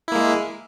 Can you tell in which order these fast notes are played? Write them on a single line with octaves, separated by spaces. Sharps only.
E4 A#3 G#3